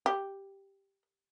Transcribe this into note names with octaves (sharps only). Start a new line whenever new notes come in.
G4